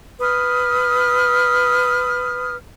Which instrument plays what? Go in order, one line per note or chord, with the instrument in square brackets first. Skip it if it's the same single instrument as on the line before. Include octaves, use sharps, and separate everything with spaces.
[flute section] B4 D#6 F6